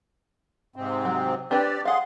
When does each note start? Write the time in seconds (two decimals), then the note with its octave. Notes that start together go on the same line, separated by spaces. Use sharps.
0.76 G#2 C3 C4
1.05 F#3
1.51 C4 D4 G4 B4 D5
1.85 G#4 F5 F#5 C6